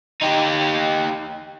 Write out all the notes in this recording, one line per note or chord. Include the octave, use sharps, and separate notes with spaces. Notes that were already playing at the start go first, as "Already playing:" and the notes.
D#4 G4